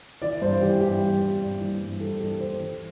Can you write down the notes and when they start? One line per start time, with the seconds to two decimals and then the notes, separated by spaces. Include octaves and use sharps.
0.22 E3 D5
0.42 G2 C5
0.61 E3 G4
0.81 G2 G4
1.02 G2
1.21 G3
1.41 G2
1.60 E3
1.81 G2
2.00 E3 A4
2.20 G2 A4
2.40 E3 C5
2.59 E3